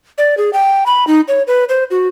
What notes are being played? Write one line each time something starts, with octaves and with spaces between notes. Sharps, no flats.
D5
G#4
G5
B5
D#4
C#5
B4
C5
F#4